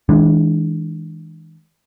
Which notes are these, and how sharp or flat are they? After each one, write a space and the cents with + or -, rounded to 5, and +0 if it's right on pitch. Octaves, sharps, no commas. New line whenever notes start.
E3 -40 G#3 +0 D4 +0